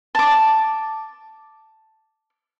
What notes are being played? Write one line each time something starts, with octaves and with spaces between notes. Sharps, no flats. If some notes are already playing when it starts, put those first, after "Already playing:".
A5 D6